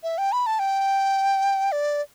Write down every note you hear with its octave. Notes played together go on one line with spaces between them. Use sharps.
E5
G5
B5
A5
G5
D5